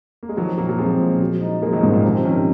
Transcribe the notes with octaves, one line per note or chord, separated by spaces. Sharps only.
A#3
G#3
D#3 F3 F#3
A#2 F#3 A#3
F#3 A#3
F3 G#3 C4
A#2
F#3
D#4
F3 G#3 A#3
D#3 F#3
G#2 C#3 F3
A#2 C#3
C3 D#3 F3
C3 D#3 C#4